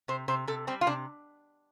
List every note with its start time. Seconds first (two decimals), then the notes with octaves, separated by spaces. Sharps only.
0.08 C3 C5
0.28 C3 C5
0.47 C3 A4
0.67 G3 C4
0.81 F4
0.87 C3 D4